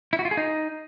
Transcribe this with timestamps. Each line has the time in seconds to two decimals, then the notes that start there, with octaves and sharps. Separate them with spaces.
0.13 E4
0.19 F#4
0.25 F4
0.31 G#4
0.37 D#4